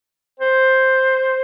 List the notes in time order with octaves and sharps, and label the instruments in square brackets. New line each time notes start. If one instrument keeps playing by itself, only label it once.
[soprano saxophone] C5